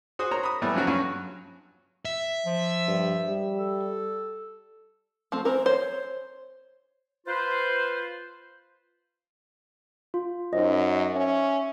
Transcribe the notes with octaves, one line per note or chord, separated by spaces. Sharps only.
F#4 G#4 C5 F#5 D#6
A#4 C5 C#5 A#5
B5 D#6
A2 E3 G3 A3 B3
C#3 F3 F#3 A#3 F#4 A#4
G2 F#3 C#4
E5
F3
G2
G3
A4
F3 A3 C4
E3 C4 A#4 C5
C5 C#5
F4 B4 C5
F4
F#2 D#4 C5 D#5
C#4 E5